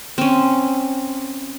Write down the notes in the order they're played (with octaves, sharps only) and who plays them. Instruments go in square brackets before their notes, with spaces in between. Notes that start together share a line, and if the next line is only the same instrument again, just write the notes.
[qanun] C4 C#4